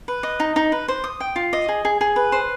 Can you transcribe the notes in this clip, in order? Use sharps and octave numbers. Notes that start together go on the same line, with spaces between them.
B4
D#5
D#4
D#4
B4
C5
D#6
G5
F4
D#5
G#4
G#4
G#4
B4
C5